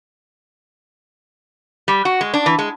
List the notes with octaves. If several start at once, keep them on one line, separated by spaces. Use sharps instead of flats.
G3
F#4
G#3
D4
E3
G#3